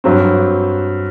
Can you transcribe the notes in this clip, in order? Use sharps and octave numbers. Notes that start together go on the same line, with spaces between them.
G2 F#3 C4